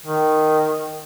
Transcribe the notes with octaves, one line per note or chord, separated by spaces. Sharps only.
D#3